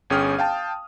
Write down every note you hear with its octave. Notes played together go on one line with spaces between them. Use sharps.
G1 C#4 G#4 G5 D#6 F6
F5 G5 A5